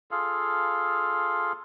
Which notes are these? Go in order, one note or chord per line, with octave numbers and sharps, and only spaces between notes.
F4 G#4 A4 F5